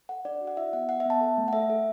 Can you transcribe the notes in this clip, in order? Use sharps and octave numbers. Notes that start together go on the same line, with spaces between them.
A4 F#5
D4 D5
F#4
F#5
E4 E5
B3 F#5
B3 F#5
E5
B3 A5
A4
A3
F#5
A4 E5
A4